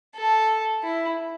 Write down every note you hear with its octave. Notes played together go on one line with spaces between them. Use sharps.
A4
E4